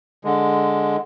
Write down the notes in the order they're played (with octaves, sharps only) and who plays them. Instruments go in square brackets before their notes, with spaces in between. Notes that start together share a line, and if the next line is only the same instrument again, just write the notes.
[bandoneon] D3 G#3